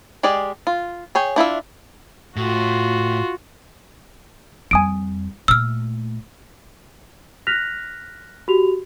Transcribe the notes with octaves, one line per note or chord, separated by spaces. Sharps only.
G#3 G4 G#4 D5
F4
G#4 C#5 G5
D4 E4 F4 E5
A2 F4 F#4
F2 G3 G#5 D#6 D7
A#2 A3 E6 F6
F6 F#6 A#6 B6 F7
F#4 G4 F7